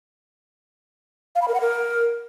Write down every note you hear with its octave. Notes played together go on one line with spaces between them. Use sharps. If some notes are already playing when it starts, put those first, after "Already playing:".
F5
B5
A#4
F#5
A#4